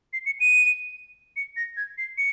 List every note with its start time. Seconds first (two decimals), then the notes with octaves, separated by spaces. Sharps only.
0.13 C7
0.26 C#7
0.40 D#7
1.36 C#7
1.57 A#6
1.77 G#6
1.98 C7
2.18 C#7